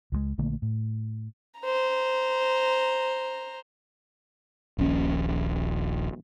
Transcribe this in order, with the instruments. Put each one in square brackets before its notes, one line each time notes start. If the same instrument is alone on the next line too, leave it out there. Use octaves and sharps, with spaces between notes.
[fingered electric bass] C#2 F3 G#3
A#1 D3 A3 A#3
A2
[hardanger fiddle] C5 A#5
[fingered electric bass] D#1 A#1 C#4